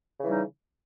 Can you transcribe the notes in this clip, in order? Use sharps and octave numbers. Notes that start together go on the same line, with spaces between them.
C#3 E3 G3 D#4